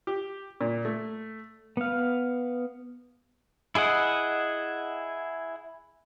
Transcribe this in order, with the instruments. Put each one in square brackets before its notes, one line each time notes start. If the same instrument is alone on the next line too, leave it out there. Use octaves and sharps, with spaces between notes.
[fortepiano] G4
A#2
A3
[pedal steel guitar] B3 F5
E4 G#4 D#5 F#5